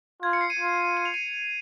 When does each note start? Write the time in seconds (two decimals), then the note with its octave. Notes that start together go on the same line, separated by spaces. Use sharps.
0.22 F4 G#6
0.33 C#7
0.41 C7
0.50 D#7
0.59 F4
0.97 D#7
1.05 F7
1.14 D#7